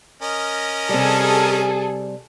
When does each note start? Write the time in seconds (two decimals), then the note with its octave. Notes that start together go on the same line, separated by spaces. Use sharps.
0.22 C#4 A#4 D#5
0.89 C3 G3 G#4 A4